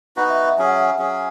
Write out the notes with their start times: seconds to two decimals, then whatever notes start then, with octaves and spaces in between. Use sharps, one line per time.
0.16 B3 D#4 F#4 B4 F#5
0.30 E5
0.44 E5
0.57 F#3 C#4 G#4 G#5
0.65 F#5
0.72 E5
0.80 F#5
0.98 F#3 C#4 G#4